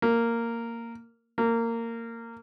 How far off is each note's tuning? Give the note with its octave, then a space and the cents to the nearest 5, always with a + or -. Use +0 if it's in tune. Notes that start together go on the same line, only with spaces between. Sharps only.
A#3 -10
A#3 -20